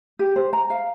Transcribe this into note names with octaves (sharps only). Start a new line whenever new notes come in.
G4
C5
A#5
F5